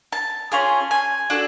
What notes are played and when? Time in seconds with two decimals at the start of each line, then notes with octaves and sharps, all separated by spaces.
0.12 A5
0.52 C#4 F4 G#4
0.91 G#5
1.30 D4 F#4 A4